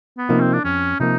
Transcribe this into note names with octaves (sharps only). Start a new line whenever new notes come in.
B3
C3 F3 A#3 D#4
C4
D4
F2 C#4
C3 F3 A#3 D#4